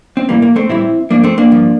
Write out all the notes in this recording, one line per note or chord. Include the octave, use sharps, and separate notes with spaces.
C4
A2 E3 G3 A#3
A#3
A3 C4
A2 E3 G3 C4 E4
G2 F3 A#3 D4
A3 C4
A#3 D4
G2 F3